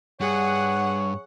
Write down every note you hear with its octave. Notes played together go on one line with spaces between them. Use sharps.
G2 G#4 C#5 F#5